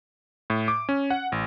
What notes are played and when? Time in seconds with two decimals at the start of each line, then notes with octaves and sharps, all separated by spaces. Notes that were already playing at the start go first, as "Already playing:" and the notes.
0.50 A2
0.68 D6
0.89 C#4
1.11 F#5
1.32 A1